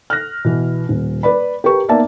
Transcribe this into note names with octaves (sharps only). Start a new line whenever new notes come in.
F6 F#6 A#6
B2 E3
D#1
B4 D5 B5
G4 A#4 B4 C#6
A#3 B3 D#4 D5 E5 A5